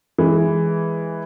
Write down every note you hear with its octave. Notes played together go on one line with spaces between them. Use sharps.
E3 G#3